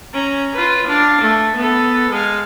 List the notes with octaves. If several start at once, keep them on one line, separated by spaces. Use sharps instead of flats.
C#4 A#5
F4 B4
D4 F5
A3
B3 A4
G#3 F5